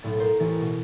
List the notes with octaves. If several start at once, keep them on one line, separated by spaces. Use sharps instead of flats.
B1 A2 A6
A#4 C5
A1 E3 A6
B2